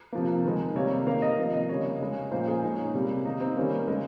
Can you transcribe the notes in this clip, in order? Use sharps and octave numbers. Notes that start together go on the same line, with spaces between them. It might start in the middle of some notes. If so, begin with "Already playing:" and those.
C3 F3 A#3
D#3 G#3
C3 G3 A#3 C#5
D#3 A#3 F5
D#5
C3 F3 A#3
D#5
C#3 G3 A#3 C#5
C#3 G#3
A#2 F3 A#3 C5
G#4
A#2 G#3 D#4
C#4
C3 G3 A#3
D#3 A#3 D#4
C4
D#3 G3 A#3 C#4
C#3 G#3